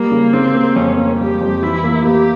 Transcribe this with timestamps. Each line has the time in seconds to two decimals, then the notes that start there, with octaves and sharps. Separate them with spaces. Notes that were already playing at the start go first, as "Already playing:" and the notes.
Already playing: G3 A#3
0.11 C#3
0.33 C#3 C4
0.54 A#3
0.76 F2 C#4
0.97 A#3
1.19 G3 G4
1.41 F2
1.62 E3 E4
1.84 A#3
2.05 A#3 G4